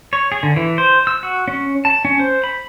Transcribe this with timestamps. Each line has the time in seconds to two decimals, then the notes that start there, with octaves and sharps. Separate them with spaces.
0.13 C#5
0.32 G#4
0.43 D3
0.56 E3
0.78 C5
1.07 E6
1.23 F#4
1.48 C#4
1.85 A5
2.05 C#4
2.20 C5
2.44 B5